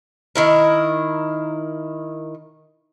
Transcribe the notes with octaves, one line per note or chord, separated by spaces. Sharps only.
D#3 E4 A#4